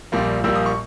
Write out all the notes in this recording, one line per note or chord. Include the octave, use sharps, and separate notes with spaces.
A#1 A#2 G3 A#3
A#1 A#2 G3 A#3 E6
D#6
C#6